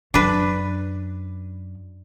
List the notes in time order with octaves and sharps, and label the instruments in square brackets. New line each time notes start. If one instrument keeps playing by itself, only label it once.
[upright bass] F#2 [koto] D4 B4